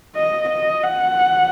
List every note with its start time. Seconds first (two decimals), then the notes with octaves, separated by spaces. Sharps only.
0.16 D#5
0.49 D#5
0.83 F#5